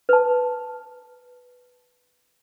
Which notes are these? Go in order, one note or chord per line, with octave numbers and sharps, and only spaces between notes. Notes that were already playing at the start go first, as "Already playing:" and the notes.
B4 A5